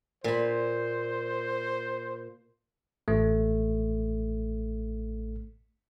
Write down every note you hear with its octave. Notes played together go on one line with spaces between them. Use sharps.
A#2 C5 B5
A1 A3